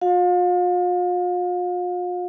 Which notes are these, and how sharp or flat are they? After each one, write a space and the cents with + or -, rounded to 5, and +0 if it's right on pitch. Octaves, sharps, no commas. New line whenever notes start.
F4 +45 F5 +35